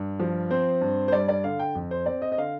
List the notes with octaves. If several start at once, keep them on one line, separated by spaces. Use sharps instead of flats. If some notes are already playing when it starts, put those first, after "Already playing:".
Already playing: G2
F3
C4 C5
G2
C5
G3 D5
D5
D3 F5
G5
F2
C5
C4 D5
D#5
D#5
D3 F5